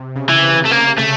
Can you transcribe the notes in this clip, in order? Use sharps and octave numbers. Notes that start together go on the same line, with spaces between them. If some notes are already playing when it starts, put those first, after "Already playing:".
Already playing: C3
C#3
E3
C3
C#3
A3
C3 A#3
A3